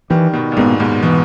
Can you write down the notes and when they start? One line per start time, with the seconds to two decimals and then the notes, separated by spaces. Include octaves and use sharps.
0.10 D#3 E3 G3
0.33 B2 D#3
0.52 A#2
0.57 G#2 B2 G#3 B3
0.80 E2 G#2
1.03 B2 E3